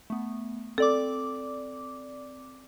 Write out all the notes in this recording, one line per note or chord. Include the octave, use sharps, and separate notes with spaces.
A3 B3
C4 A4 D5 D6